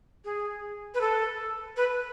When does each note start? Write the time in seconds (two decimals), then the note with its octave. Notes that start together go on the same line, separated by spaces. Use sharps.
0.25 G#4
0.94 B4
1.01 A4
1.77 B4